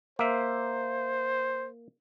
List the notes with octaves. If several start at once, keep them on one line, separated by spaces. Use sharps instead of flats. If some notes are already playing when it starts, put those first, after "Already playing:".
A#3 C5 E5